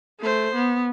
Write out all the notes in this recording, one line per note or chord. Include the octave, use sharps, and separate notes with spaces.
A3 C5
B3